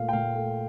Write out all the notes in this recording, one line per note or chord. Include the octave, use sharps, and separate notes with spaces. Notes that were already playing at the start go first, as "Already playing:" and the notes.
Already playing: A#2 A3 F5
G5
A#2 F5
A3